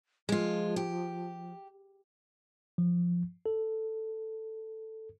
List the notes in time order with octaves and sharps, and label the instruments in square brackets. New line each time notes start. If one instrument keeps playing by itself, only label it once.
[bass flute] F3 [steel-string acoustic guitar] G#3 F4
[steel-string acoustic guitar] G4
[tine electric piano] F3
A4